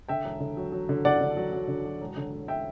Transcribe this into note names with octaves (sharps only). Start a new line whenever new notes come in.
D3 E5 G5
E1
D3
F#3
F#3
D3
D3 D5 F#5
D3
F#3
F#3
D3
F#3
E1
D3
E1
E5 G5